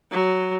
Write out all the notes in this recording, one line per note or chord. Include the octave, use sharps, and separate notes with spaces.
F#3